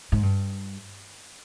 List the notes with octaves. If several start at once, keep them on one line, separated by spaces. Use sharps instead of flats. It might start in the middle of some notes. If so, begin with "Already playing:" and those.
G#2
G2